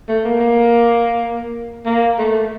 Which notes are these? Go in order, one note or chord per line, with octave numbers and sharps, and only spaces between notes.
A3
A#3
A#3
A#3
A3